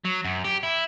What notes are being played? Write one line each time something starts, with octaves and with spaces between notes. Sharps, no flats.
F#3
F#2
G4
E4